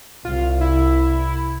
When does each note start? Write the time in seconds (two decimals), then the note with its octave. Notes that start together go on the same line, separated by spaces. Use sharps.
0.25 C2 F4
0.61 E4